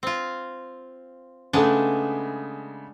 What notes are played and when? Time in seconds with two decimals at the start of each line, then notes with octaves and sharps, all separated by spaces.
0.03 C4 F4
1.53 C#3 G#3 A3 B3 D4